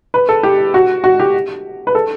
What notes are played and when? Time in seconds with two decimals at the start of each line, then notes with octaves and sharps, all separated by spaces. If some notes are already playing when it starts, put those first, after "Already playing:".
0.14 B4
0.29 A4
0.43 G4
0.74 F#4
1.04 F#4
1.20 G4
1.87 B4
1.95 A4